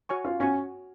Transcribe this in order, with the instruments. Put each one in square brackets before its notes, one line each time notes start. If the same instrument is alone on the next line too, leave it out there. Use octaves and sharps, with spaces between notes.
[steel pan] F#4 C#5 G#5 C#6
[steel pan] C#4 [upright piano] F4
[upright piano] C#4 [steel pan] F#4 C#5 G#5 C#6